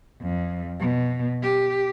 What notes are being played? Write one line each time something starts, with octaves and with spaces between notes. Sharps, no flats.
F2
B2
G4